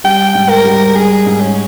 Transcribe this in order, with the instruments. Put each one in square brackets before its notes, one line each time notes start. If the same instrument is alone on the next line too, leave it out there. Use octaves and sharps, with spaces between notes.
[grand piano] G3 [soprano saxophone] G5
[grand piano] G#2
[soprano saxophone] A#4
[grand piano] G3
[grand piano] G3 [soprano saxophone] G#4
[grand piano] G#2
[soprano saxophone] C#4